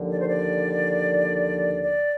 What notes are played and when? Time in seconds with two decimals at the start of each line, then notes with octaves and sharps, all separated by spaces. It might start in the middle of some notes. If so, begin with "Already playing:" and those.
Already playing: D#2 D3 F3
0.10 D5
0.19 C5
0.28 D5
1.82 D5